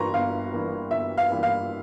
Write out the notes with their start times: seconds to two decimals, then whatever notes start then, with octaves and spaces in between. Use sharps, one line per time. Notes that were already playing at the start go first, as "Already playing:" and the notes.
Already playing: G1 G2 E3 A#3 A#5 C6 C#6
0.14 G1 F5
0.53 G2 E3 A#3
0.91 G1 E5
1.18 F5
1.30 G2 E3 A#3
1.43 F5